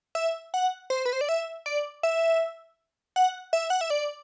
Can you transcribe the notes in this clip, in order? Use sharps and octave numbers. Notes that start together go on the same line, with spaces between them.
E5
F#5
C5
B4
C5
D5
E5
D5
E5
F#5
E5
F#5
E5
D5